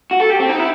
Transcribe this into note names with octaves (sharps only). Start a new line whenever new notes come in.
F#4
A4
G4
C4
D#4
E4